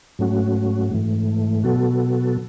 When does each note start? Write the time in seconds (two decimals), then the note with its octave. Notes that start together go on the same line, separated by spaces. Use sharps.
0.19 G#2 F#3 A3 C#4 F#4
0.91 G#2 E3 A3
1.64 B2 F#3 B3 F#4 A4